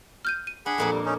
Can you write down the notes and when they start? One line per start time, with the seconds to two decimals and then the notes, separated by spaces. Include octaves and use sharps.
0.25 F6 G6 D#7
0.47 D#7
0.66 D4 G#4 F#5 B5
0.78 F2 A#2 A#3
0.92 G3
1.05 C#4 D#4